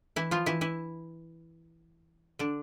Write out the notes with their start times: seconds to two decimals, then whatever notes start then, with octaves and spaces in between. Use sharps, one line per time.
0.16 E3 E4
0.31 F3 F4
0.46 E3 E4
0.61 E3 E4
2.39 D3 D4